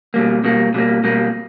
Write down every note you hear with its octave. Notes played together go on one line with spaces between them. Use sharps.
B2 G3 A#3
B2 G3 A#3
B2 G3 A#3
B2 G3 A#3